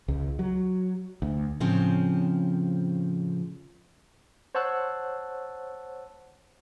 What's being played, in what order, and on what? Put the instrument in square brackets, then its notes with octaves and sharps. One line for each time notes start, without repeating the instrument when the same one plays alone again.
[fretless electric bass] C#2
F#3
D2
[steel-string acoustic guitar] A2 C#3 F3 C4
[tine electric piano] C5 C#5 F#5 A5 E6 F#6